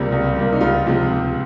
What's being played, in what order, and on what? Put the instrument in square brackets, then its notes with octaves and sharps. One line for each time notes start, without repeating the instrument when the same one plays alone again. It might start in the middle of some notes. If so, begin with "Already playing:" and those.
Already playing: [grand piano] C#2 C3 G3 A#3 F4
C#2
C3 G3 A#3
D#4
C#2 F4
C3 F3 G#3
C#2